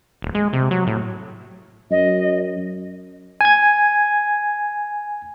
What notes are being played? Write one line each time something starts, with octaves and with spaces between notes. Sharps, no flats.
D#1
G#3
C3
F#3
A2
F#2 D#5
G#5 G#6